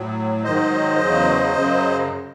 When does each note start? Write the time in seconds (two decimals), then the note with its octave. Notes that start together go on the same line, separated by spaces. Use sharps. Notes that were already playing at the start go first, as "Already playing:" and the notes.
Already playing: A2 F#3
0.43 G#2 D#3 F#3 C5 D#5
0.99 E2 C#3 F#3
1.54 F#2 C#3 F#3